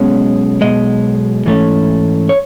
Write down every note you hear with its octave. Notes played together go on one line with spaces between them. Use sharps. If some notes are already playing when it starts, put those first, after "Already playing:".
Already playing: B1 B2 G#3 C#4
B1 B2 G#3 D#5
G#2 E3 A3 C#4
C#5